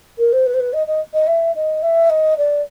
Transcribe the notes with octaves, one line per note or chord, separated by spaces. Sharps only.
A#4
C5
B4
C5
B4
D#5
D#5
D#5
E5
D#5
E5
D#5
D5